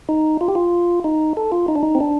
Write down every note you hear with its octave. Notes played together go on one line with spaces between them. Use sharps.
D#4
F4
G4
F4
D#4
A4
F4
D#4
D4
D#4
C4
D4